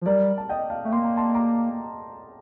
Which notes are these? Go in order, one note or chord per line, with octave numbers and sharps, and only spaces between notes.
F3
G3 A#4 D5
A5
D#5 G5
F5 A5
A3
A#3 C6
A#5
A5 C6
A#5 D6